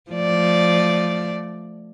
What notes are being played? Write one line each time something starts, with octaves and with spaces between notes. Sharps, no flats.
F3 A3 D5